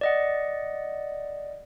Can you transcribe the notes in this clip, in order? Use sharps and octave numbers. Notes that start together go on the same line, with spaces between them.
D5 D#5 F#5